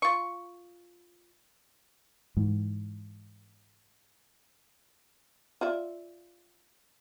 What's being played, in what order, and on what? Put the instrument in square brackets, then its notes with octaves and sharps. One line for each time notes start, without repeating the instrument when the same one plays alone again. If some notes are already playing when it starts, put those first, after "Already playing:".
[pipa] F4 C#6
[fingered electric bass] G#2 E3
[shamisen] F4 D5 E5